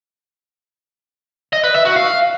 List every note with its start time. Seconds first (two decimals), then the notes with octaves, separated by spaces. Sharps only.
1.53 D#5
1.64 B4
1.74 E5
1.85 F#4
1.96 F5